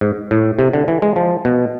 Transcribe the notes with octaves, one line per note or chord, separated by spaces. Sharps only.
G#2
A2
C3
D3
E3
G#3
F3
B2